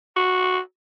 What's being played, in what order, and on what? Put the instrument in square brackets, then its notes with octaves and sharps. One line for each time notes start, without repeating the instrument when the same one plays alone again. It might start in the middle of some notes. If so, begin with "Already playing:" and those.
[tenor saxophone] F#4